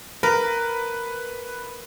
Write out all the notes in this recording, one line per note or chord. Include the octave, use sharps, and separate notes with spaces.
A#4 B4